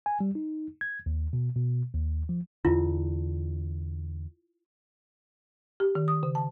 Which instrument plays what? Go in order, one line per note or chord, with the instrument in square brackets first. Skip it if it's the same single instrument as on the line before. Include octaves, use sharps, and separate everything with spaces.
[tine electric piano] G#5
G3
D#4
G#6
D#2
B2
B2
D#2
F3
[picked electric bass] E2 D3 [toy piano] E4 F4
[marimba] G4
D#3
D#6
C#3
A5